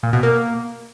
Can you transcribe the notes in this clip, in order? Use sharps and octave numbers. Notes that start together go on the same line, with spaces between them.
A#2
B2
A#3